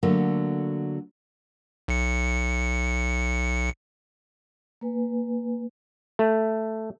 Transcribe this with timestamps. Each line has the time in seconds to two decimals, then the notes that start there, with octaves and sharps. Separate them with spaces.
0.03 D3 F#3 A3 A#3
1.88 B1 C#7
4.81 A#3 B4 G#5
6.19 A3